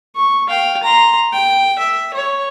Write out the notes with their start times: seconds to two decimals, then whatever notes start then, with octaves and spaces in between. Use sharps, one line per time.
0.16 C#6
0.48 F5 G5
0.83 A#5 C6
1.33 G5
1.79 E5
2.13 C#5